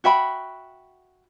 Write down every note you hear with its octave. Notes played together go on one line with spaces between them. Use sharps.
F#4 E5 G5 B5